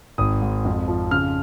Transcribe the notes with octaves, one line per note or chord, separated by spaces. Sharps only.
G#1 D#6
G#2
F2
F3
C#3 F6